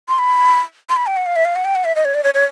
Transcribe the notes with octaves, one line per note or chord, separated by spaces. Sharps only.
C6
B5
C6
B5
G5
F#5
F5
E5
F5
F#5
G5
F#5
E5
D#5
C#5
D5
C#5
C#5